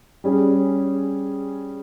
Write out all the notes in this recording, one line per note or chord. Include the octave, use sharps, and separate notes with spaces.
G3 C#4 G#4